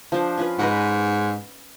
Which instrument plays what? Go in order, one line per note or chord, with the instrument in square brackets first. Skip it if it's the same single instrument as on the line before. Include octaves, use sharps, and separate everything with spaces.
[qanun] F3 D4 C5
C#4 F4 B4
[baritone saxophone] G#2 [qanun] B4 D#5 F#5